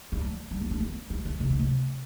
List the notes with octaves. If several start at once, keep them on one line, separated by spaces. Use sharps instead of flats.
G3
F3
G3
B3
D4
B3
G3
D3
C3
D3
C3